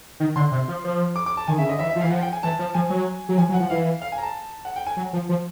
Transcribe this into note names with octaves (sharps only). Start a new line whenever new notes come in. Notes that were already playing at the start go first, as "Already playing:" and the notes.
D#3
D3 C6
C3
F3
F3
D6
D6
A5
D#3 G#5
C#3 E5
D3 D#5
E3 E5
E5
F3
E3 F5
F3 F#5
G5
G#5
E3 A5
F3
F3 G#5
F#3
F#3
F3 G#5
F#3
F#5
F3
E3 F5
F5
G#5
A#5
A5
F#5
G5
G#5
F#3
F3
F3